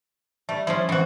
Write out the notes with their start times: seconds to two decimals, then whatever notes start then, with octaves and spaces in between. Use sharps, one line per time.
0.49 G3 A3
0.67 F3 C#4 E4 F4
0.89 E3 G#3 C4 F#4